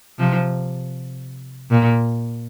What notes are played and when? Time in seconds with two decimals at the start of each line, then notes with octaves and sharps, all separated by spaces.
0.19 C3 F3
1.71 A#2